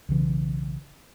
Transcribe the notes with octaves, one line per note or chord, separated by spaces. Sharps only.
B1 C#3 E3